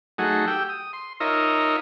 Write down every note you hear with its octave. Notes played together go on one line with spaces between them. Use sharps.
F#3 A3 D#4 F#4 G#4
G4 G5 E6
D#6
C6
D#4 F4 A#4 C#5 D#5 E5